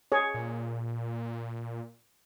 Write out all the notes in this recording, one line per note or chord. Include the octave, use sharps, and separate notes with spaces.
G#4 C#5
A#2